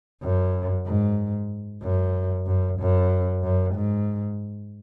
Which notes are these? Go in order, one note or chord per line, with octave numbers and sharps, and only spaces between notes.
F#2
G#2
F#2
F#2
F#2
F#2
G#2